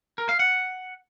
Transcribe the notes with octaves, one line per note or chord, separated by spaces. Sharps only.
A#4
F5
F#5